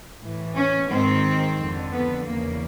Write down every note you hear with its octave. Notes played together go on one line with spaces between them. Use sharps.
A2 E3
C#4
G#2 D#3 C4
F2 D3
B3
E2 C#3 E3 A#3